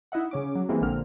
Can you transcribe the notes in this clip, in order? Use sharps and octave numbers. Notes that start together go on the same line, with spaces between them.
D#4 E4 D#5 E5 F#5
C#3 C#4 D6
F#3
E3 G3 G#3 A#3 C4
A#1 A#2 D3 A#3 C4 F6